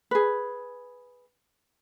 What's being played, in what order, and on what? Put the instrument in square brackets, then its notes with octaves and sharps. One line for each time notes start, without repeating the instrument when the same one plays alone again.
[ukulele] G#4 B4